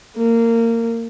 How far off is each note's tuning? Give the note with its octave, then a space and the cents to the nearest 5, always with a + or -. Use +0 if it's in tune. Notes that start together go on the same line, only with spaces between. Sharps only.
A#3 -20